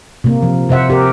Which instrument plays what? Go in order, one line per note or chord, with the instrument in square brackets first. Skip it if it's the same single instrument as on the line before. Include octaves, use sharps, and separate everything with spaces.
[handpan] C3 A#3
F3
C3 C5 E5 F#5
G4 A#4